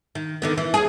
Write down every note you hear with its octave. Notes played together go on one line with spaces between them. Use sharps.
D#3
D3 D#3 B3
E3
D#2 G#4